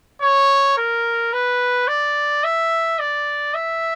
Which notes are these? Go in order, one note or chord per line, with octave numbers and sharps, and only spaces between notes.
C#5
A#4
B4
D5
E5
D5
E5